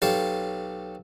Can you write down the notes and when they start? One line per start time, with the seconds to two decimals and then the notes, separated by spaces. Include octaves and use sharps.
0.02 B1 G4 A4 C#5 F5 A5